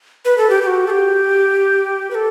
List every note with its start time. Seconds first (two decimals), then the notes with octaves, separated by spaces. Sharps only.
0.25 B4
0.38 A4
0.50 G4
0.62 G4
0.67 F#4
0.87 A4
0.90 G4
2.11 B4
2.15 A4